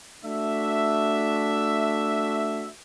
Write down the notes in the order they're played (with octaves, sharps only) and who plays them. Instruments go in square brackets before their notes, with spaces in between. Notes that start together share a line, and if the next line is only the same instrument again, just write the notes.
[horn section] A3 D4 F#4 E5